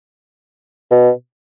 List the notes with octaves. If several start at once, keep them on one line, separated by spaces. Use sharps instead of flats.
B2